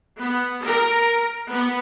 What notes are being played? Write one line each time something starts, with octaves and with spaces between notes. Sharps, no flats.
B3
A#4
B3